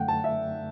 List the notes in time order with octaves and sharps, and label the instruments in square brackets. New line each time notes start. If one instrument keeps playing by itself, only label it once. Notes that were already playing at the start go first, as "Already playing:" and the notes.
Already playing: [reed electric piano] F#2 D3 A3 [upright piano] F#5 G5
[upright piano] A5
E5